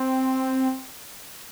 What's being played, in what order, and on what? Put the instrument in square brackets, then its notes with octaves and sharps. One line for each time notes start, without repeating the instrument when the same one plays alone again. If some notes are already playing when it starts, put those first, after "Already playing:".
Already playing: [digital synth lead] C4